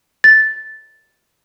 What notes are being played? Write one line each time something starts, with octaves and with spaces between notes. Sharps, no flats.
A6